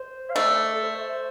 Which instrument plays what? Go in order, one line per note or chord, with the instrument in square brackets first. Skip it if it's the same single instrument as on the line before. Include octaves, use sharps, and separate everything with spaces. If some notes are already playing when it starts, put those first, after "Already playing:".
Already playing: [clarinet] C5
F5
[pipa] A3 [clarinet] D5
[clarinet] A4
C5